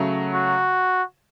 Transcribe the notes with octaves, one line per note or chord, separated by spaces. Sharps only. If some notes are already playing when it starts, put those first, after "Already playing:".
Already playing: C#3 F#3 A3
F#4